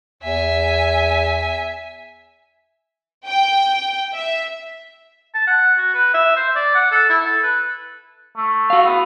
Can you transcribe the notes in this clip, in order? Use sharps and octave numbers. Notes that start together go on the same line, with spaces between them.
E2 E5 G#5
G5
E5
A5
F#5
F#4
B4
E5
C5
D5
F#5
A4
E4
A4
B4
A3
F#4 F5
B3